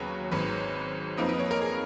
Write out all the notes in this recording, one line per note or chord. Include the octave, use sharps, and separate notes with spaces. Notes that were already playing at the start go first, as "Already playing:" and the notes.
Already playing: D#2 C#3 F#3 B3 B4 C#5
G#1 G#2 F#3 B4
F2 F3 A#3 D#4 B4
B4
C#5
A#4
G#4